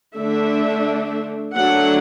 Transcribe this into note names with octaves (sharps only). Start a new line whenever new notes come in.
D3 A3 D4 E5
F#3 A3 D4 F#5